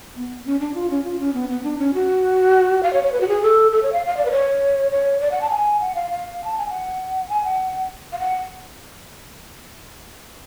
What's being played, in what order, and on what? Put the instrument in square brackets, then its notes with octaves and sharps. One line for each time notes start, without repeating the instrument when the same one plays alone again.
[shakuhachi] B3
C#4
D4
F4
C#4
F4
C#4
B3
B3
D4
C#4
F#4
F5
C#5
C#5
B4
F#4
G#4
A4
A4
C#5
F5
F5
D5
B4
C#5
C#5
D5
F#5
A5
G#5
F#5
F5
F5
A5
G#5
F#5
G#5
F#5
F5
F#5